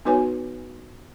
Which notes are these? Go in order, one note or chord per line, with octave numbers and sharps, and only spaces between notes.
B3 D#4 F#4 B4 C#5 G#5